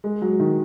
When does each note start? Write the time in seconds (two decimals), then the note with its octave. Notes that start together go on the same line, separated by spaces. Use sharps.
0.04 G#3
0.22 F#3
0.40 D#3